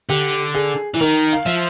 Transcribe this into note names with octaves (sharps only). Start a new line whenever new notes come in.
D3 G4
G#4
E3
D#3 A#4
F5
F3 E5